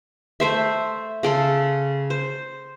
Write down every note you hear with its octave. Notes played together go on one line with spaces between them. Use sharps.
A3 C5 E5
C#3 A4 C6
C5